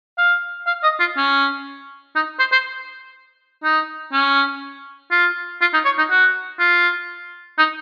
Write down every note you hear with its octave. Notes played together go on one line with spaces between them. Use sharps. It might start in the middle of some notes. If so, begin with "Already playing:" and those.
F5
F5
D#5
F4
C#4
D#4
C5
C5
D#4
C#4
F4
F4
D#4
C#5
D#4
F#4
F4
D#4